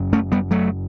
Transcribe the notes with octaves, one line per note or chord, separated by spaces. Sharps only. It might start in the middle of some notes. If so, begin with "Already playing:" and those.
Already playing: F#1 F#2
A3 C#4
G3 B3
F#3 A3